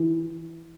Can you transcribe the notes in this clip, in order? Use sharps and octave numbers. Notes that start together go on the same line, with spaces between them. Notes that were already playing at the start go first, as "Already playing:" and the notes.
Already playing: E3